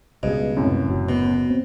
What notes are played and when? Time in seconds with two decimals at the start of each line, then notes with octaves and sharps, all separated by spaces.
0.23 C#2 G2 B2 G#4 D#5
0.56 F#2 A2 C3
0.88 F#1 F#3
1.09 B2
1.50 C4